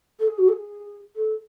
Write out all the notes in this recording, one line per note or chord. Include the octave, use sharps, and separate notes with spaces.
A4
G#4
F#4
A4
G#4
A4